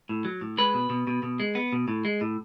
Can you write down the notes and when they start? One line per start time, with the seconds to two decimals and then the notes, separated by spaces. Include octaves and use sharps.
0.09 A2
0.25 F#3
0.41 A2
0.58 G#3 B4
0.74 B2
0.90 B2
1.07 B2
1.23 B2
1.40 G#3
1.55 B3
1.73 B2
1.88 A2
2.05 G#3
2.21 A2